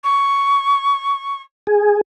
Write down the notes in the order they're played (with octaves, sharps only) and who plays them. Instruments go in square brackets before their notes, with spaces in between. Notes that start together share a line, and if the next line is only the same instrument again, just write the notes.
[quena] C#6
[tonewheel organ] G#4